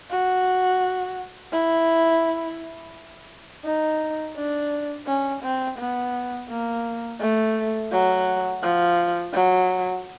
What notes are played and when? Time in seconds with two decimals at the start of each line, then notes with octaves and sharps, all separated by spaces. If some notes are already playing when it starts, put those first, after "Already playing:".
0.10 F#4
1.52 E4
3.65 D#4
4.36 D4
5.07 C#4
5.43 C4
5.78 B3
6.49 A#3
7.20 A3
7.91 F#3
8.63 F3
9.33 F#3